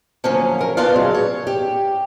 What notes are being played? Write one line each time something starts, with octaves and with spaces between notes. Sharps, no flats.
D3 F3 F#3 A#3 C#4
A#4
B3 C#4 D4 F4 D5 F5
C#3 F#3 G#3
C#5
G4